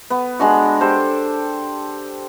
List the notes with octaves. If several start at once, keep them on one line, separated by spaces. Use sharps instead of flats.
B3
G#3 D4 F#4
G4 A4 C5